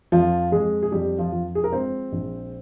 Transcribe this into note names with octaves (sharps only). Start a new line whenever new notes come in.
F2 F3 F4
F2 G#3 G#4
G#4
F2 G3 G4
F3 F4
F3
G#4
A#4
G#3 C4 C5
A#1